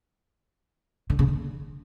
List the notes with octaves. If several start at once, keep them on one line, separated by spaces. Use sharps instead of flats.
D3
C#3
D3